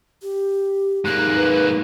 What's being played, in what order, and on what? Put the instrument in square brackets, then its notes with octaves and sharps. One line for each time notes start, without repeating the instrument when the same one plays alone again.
[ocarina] G4
[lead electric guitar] G#2 A#3 [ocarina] D#4 [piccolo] F#6
[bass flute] B4